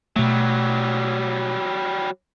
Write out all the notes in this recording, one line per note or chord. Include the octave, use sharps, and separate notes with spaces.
B2 F#3 G3 A3